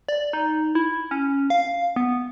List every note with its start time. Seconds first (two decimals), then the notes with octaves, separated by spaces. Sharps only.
0.09 D5
0.33 D#4
0.75 E4
1.11 C#4
1.50 F5
1.96 B3